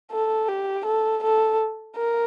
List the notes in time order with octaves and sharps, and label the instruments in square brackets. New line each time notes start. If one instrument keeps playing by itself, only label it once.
[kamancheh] A4
G4
A4
A4
A#4